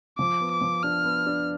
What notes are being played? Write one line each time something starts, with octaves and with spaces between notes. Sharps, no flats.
F3 D6
B3
D6
F3
D4 F6
B3
D4